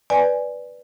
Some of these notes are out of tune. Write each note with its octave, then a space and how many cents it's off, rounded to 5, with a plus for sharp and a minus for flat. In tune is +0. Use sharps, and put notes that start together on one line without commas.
B4 +0 D5 +0 G#5 +0